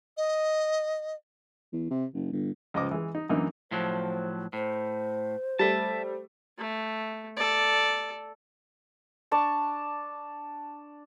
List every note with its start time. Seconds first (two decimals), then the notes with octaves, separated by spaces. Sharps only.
0.17 D#5
1.73 E2
1.91 C3
2.14 F#1
2.33 G1
2.74 C#2 F3 D#5 D6
2.91 E3 G#3
3.15 D#4
3.30 F#2 D3 E3 A#3 D#4
3.71 A2 F3 F#3 C5
4.53 A2 C5
5.59 G3 A3 E5 A5
6.58 A3
7.37 A4 D5
9.31 D4 D5 A5 C#6